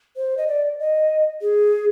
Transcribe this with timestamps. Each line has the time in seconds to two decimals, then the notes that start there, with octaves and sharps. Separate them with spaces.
0.17 C5
0.37 D#5
0.48 D5
0.80 D#5
1.42 G#4